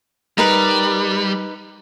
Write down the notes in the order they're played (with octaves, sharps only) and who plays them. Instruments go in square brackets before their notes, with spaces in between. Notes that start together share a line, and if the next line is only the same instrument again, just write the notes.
[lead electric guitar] G3 [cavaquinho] D#4 A#4 B4